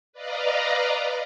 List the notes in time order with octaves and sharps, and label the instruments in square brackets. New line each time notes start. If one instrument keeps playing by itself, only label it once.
[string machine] B4 D5 D#5 F5 A#5